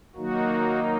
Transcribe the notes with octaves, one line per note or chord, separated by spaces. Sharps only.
D#3 F#3 A#3 D#4 F#4